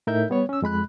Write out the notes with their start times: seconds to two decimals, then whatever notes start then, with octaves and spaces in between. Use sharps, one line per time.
0.07 A2 D#4 A#4 E5 G6
0.30 G3 B3 C#5
0.49 C#4 E6
0.62 F2 G#3 B5 F#6